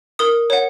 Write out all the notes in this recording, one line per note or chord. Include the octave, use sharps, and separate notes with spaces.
A#4 D#6
C#5 F#5